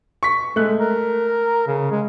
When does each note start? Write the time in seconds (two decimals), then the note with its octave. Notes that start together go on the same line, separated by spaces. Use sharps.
0.23 C#6 B6
0.56 G#3 A3 F#6
0.80 A#4
1.67 C#3
1.91 G#3